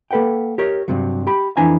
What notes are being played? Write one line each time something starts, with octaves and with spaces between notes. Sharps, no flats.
A#3 A4 B4 F#5 G5
G4 A#4 C#5
G2 C3 F#3
G4 B5
F2 E3 D4 G#5 A#5